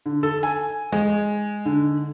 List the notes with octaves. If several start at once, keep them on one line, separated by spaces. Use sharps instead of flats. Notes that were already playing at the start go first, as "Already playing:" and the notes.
D3
A4
G#5
G#3
D3